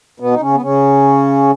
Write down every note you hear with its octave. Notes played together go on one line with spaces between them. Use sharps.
B2 B3
D#4
C#3 C#4
B3
C#3 C#4